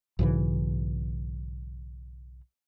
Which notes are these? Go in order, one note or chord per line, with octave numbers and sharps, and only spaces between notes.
B1 G#2 C#3 E3